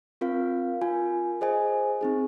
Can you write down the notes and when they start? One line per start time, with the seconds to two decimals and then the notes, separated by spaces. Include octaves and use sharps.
0.21 C4 F4 A#4 F5
0.81 F4 A#4 G#5
1.41 G#4 C5 D#5 G#5
2.01 C4 D#4 G#4